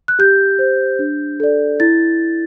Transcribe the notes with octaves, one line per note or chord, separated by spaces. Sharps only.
F#6
G4 G6
C5
D4
A4 D5
E4 A6